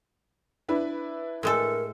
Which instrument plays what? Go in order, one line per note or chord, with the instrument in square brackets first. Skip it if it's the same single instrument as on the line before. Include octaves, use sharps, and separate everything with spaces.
[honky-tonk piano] D4 E4 B4
[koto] A2 G#3 A4 [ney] A#4